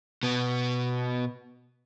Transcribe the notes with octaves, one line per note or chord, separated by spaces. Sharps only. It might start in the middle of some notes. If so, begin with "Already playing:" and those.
B2 B3